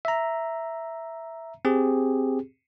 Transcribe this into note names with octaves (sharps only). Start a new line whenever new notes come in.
E5 A#5
C4 G4 G#4